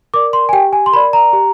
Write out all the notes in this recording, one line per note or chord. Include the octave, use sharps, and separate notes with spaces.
A#4 D5 D6
C6
G#5
G4 G5
G#5
C6
A#4 D5 B5
A#5
G4